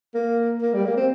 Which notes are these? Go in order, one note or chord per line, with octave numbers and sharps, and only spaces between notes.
A#3
A#3
G3
A#3
C4